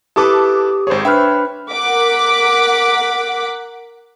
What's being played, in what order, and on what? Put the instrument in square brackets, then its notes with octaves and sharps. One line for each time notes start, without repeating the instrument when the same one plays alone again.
[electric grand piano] E4 A4 B4 [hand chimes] G4 [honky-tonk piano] A5 D6 [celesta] D#6
[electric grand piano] G#1 G#4 [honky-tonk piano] C5 C#5
[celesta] D4 B4 F6 [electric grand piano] E5 [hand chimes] G5 B5 F#6
[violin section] A#4 F#5 D6 B6